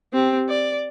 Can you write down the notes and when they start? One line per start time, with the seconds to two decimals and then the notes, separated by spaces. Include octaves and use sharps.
0.13 C4 G4
0.49 D5